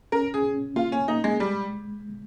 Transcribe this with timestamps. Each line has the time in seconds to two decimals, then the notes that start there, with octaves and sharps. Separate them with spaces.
0.12 C#4 A#4
0.34 G#4
0.44 C#4
0.76 A#3 F4
0.92 C#4
1.08 A#3 D#4
1.24 G#3
1.40 G3 G#3